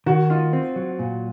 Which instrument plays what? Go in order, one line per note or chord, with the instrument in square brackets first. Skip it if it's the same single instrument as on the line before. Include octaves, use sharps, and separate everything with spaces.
[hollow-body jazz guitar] D#3 [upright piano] F#4
[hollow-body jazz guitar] D#4 [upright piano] F4
[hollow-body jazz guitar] C4
F#3
A#2